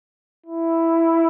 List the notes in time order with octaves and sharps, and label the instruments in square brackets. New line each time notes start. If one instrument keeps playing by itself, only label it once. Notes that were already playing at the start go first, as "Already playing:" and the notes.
[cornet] E4